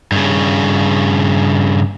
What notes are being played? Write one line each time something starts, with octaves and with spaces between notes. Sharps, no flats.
G2 C#3